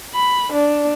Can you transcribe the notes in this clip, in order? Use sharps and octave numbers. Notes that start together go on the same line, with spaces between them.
B5
D4